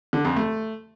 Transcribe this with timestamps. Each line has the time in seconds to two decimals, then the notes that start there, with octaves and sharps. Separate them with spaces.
0.13 D3
0.25 F2
0.36 A3